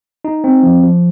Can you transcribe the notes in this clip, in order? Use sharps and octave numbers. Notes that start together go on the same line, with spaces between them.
D#4
C4
F3
F3